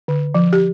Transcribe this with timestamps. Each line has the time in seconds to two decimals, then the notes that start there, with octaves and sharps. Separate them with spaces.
0.08 D3
0.35 F3
0.53 G4